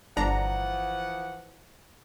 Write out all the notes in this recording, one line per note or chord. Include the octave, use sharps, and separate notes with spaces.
G1 E3 F3 D4 F#5 A#5